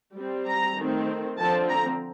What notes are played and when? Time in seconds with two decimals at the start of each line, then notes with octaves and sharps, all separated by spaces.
0.16 G3 C4
0.47 A#5
0.77 D#3 A3 C4
1.39 D3 F3 C4 A5
1.69 A#5